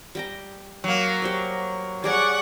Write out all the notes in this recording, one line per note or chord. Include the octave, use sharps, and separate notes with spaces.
G3 G5 A#5
F#3 A#3
G4 C5 D5
G3 G#4 C#5 D5 F#5 C#6